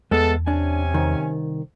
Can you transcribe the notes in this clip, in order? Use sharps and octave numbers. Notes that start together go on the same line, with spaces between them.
E2 G#3 A3 B3 A4
C3 C#4 D4 G#5
C2 D#3